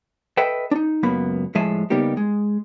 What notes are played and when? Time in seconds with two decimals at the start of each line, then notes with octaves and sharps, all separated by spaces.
0.37 A4 B4 D#5 E5 G5
0.71 D4 D#4
1.03 C#2 F#2 A#3 B3 B5
1.55 A2 F3 G#3 E5 G#5 A5
1.90 C#3 G3 A#3 B3 D#4 G4
2.17 G#3